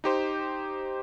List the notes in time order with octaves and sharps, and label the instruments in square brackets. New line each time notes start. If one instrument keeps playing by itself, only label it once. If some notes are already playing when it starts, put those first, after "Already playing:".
[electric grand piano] D#4 G4 C5